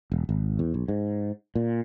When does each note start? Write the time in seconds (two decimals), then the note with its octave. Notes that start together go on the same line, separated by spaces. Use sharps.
0.12 E1
0.29 G#1
0.59 E2
0.74 B1
0.88 G#2
1.55 A#2